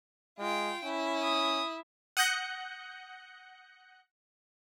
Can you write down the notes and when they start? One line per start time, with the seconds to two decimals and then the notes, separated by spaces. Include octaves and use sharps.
0.39 G#3 F4 G5
0.85 C#4 E4
1.22 D#6
2.17 F#5 D#6 F#6 G6 A#6 C#7